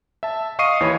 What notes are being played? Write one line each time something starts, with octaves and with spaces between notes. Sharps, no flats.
E5 A5
D#5 F5 C#6 D#6 C7 D#7
D#2 E3 C#5 B5